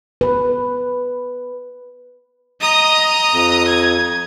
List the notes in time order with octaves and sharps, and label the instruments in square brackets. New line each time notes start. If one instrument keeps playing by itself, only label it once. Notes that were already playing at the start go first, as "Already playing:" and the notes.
[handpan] B4
[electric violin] D#5 A#5 [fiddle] D#6
[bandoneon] F2
[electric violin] G#6